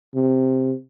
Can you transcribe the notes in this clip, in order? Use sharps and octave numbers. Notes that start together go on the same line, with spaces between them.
C3